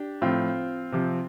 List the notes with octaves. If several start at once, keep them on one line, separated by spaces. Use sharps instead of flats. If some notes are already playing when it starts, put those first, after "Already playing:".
Already playing: D4 G4
A2 F3 C4 F4
C3 F3